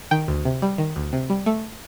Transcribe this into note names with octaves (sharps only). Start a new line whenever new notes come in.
D#3 G5
D2
C3
G3
D#3
D2
C3
G3
A3